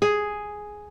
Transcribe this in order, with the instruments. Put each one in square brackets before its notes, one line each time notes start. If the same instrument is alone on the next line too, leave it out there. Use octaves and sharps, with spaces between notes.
[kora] G#4